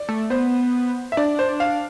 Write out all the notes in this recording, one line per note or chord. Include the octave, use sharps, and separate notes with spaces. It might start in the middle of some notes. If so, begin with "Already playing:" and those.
Already playing: D5
A3
B3 C5
E5
D4 D5
C5
F5